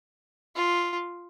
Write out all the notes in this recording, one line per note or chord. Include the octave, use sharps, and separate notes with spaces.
F4